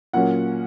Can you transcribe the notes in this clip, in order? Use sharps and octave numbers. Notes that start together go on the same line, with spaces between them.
A#2 F#3 A#3 C#4 F#5